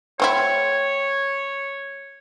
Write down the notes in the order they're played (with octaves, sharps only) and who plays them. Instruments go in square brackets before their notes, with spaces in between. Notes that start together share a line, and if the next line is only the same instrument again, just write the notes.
[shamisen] A3 C4 E4 [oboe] C#5